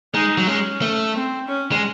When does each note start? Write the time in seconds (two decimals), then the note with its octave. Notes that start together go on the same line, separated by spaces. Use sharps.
0.14 G#3 D#4
0.38 F#3
0.47 G#3 C#4
0.82 A3
1.16 C4
1.48 C#4
1.72 G#3